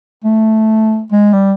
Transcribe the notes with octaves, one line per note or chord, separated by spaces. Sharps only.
A3
G#3
G3